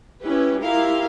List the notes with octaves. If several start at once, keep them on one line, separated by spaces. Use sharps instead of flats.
C#4 E4 G4 B4
E4 F4 G4 A#4 F5